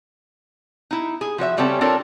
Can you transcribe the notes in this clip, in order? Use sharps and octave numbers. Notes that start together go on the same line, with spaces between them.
D#4 E4
G#4
F3 F#4 C#5 E5
C#3 G3 C4 C#4 A4
C4 D4 F4 A4 A#4 C#5